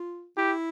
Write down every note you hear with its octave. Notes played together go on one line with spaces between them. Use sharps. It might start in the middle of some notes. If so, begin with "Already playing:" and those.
Already playing: F4
E4 G4